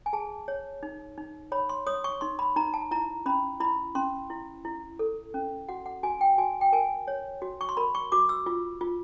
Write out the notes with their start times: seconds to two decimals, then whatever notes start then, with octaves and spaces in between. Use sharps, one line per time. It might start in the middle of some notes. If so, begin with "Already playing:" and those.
0.06 G#5
0.13 G#4 A5
0.48 C#5
0.83 D#4
1.18 D#4
1.52 C#5 B5
1.69 C6
1.87 C#5 D#6
2.04 C#6
2.21 D#4 C6
2.39 B5
2.56 D#4 A#5
2.74 A5
2.91 E4 A#5
3.26 C#4 B5
3.60 E4 B5
3.95 C#4 C6
4.30 E4
4.65 E4
4.99 A4
5.34 C#4
5.69 F#4 F#5
5.86 F#5
6.03 F#4 G#5
6.21 G5
6.38 F#4 G#5
6.61 G5
6.73 A#4 G#5
7.08 C#5
7.42 F#4
7.61 C#6
7.69 C6
7.77 A#4 B5
7.95 C#6
8.12 F#4 D6
8.29 E6
8.46 F4
8.81 F4